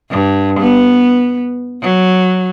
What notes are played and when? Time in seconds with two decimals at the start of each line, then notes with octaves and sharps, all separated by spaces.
0.10 G2
0.59 B3
1.82 F#3